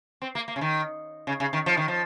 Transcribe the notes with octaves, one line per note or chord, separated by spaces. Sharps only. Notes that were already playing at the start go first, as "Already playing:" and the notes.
C4
A#3
A#3
C#3
D#3
C#3
C#3
D#3
F3
D#3
F3